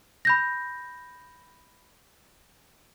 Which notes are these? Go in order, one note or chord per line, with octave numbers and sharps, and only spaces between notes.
B5 G6 A#6